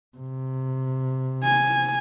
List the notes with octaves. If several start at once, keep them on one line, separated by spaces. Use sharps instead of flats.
C3
G#5